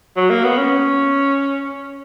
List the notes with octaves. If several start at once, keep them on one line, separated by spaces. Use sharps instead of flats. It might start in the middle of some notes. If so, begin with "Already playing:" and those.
F#3
A#3
B3
C#4